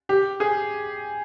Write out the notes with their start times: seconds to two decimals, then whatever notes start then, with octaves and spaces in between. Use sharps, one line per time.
0.09 G4
0.40 G#4